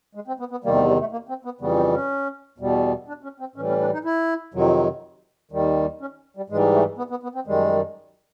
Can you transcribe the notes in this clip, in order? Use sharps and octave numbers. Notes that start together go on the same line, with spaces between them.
G#3
C4
B3
B3
E2 C3 D#3 G3 A#3
A3
G3
A3
A#3
C4
B3
F2 C#3 E3 G3 B3
C4
C#4
E2 B2 G3
D4
C#4
C4
A2 E3 G3 C#4
C#4
D4
D#4
E4
F2 C3 D#3 F#3
D#2 D#3 G3
C#4
G3
G#2 E3 G3 G#3
A3
B3
B3
B3
C4
F#2 D#3 G3 G#3